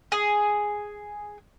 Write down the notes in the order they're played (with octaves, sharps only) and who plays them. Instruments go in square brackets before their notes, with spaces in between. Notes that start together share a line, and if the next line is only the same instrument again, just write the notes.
[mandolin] G#4